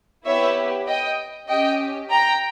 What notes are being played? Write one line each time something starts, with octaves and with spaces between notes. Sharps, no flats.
B3 E4 G4 C#5 E5
D#5 G5
C#4 G4 D#5 G5
G5 A#5